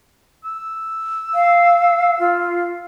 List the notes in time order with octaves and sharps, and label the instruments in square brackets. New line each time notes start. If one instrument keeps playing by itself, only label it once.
[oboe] E6
[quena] F5
F4